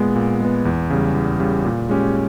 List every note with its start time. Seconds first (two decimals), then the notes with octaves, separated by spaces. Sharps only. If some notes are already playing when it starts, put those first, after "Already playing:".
Already playing: A#2 G#3 B3
0.16 A#2
0.41 G#3 B3
0.65 E2
0.90 C#3 G3
1.15 E2
1.40 C#3 G3
1.65 A#2
1.89 G#3 C#4 G4